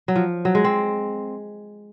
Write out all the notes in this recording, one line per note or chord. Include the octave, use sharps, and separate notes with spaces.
F#3
F3
F#3
G#3
C4